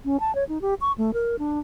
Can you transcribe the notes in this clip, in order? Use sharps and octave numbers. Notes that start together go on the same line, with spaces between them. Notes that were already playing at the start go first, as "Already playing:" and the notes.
C#4
A5
C#5
D#4
G4
C#6
A3
A#4
D4